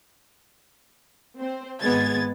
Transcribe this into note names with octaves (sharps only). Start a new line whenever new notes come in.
C4 C5
G#1 G#3 B3 G#6 A6